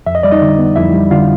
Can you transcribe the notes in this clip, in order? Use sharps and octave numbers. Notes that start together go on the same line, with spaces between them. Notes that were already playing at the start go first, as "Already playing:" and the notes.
F2 E5
D#5
G3 D5
D#4 D#5
D3
B3
F2 E4 E5
G3
D3 F4 F5